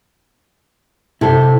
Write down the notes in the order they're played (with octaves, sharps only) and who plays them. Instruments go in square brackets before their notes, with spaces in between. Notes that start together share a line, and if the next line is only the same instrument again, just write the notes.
[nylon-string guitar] C3 C5 [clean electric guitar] E4 A4